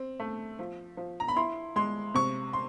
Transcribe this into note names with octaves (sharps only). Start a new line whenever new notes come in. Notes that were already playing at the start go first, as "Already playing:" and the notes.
Already playing: C4
A3
F3
F3
A#5
B5
E4 C6
G#3 C6
C3 C#6
C6